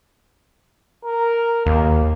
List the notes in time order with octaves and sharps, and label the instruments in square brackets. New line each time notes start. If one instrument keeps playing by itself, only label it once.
[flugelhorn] A#4
[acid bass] D#2 [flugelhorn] A#3